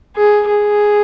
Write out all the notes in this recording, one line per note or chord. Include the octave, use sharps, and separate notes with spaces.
G#4
G#4